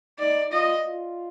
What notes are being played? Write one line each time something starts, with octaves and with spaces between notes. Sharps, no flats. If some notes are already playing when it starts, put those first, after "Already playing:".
D#4 D5
F4 D#5
F4